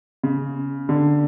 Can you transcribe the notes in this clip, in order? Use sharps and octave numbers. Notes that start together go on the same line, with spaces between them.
C#3
D3